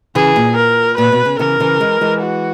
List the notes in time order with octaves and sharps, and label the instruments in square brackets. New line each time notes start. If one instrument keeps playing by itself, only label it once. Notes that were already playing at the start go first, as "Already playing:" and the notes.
[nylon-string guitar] C#3 E3 [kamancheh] G#4
[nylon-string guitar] A#2
[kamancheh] A#4
[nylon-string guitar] A#2 [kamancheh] B4
[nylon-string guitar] B2
C#3
[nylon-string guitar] C#3 E3 [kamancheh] A#4
[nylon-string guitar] C#3 E3
E3 G#3
E3 G#3
[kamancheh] F#4